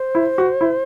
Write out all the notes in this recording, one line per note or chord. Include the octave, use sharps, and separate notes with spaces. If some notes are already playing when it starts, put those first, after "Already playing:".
Already playing: C5
E4
F#4
E4